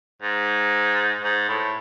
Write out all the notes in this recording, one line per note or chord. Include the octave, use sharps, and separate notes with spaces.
G#2
G#2
A2